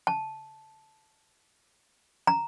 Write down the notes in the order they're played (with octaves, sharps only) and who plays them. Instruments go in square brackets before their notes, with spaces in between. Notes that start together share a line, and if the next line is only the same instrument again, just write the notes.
[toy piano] A5
A#5